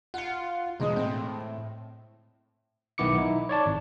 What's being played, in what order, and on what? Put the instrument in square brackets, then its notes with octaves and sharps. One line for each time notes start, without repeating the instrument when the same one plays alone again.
[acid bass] F4 [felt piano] F#5 C#7
[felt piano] E1 G#3 D#6 [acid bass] B2
[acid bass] A2 [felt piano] C4
[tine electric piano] B1 D#3 B3 E4 D6 C#7
D#4 E4
C#5 D5 A5
G#1